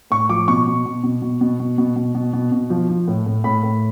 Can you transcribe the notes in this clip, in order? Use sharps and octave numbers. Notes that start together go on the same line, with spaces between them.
A2 C#6
F3 D6
B2 C#6
B2
B2
B2
B2
B2
B2
B2
B2
B2
B2
B2
F3
F3
A2
A2
A2 B5
A2